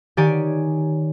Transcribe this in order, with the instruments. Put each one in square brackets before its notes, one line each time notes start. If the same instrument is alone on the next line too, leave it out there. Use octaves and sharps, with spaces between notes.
[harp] D#3 G4 C#5 D5 G#5